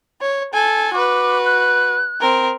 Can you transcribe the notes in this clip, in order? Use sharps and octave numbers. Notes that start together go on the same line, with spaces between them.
C#5
A4 G#5
F#4 B4 D6
F#6
C4 A#4